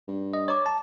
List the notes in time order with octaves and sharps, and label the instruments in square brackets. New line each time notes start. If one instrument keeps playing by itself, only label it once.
[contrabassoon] G2
[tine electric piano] D#5
[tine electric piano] C#5 [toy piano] D#5 A#5 D6
[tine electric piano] A5